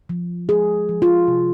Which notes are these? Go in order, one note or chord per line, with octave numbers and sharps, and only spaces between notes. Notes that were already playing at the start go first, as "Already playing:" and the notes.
F3
G#3 G#4
F3
F4
C3